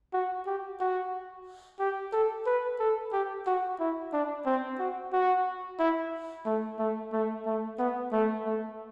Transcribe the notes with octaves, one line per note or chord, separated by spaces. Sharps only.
F#4
G4
F#4
G4
A4
B4
A4
G4
F#4
E4
D4
C4
F#4
F#4
E4
A3
A3
A3
A3
B3
A3
A3